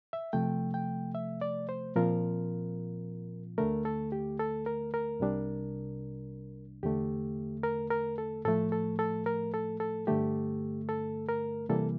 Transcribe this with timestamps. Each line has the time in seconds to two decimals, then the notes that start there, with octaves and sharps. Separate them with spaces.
0.13 E5
0.33 C3 F3 A3 G5
0.74 G5
1.15 E5
1.41 D5
1.69 C5
1.96 A#2 F3 C4 F4 A#4
3.58 D2 D3 A3 A#4
3.85 A4
4.12 G4
4.40 A4
4.66 A#4
4.94 A#4
5.20 C2 C3 G3 D4
6.83 E2 D3 A3 G4
7.63 A#4
7.90 A#4
8.18 A4
8.45 A2 F3 A3 A4
8.72 A4
8.99 A4
9.26 A#4
9.54 A4
9.80 A4
10.07 G2 D3 A3 G4
10.89 A4
11.29 A#4
11.69 C3 E3 G3 A#3 A4